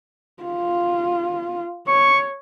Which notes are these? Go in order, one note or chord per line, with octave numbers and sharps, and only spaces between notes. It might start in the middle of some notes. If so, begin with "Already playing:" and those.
F4
C#5 C#6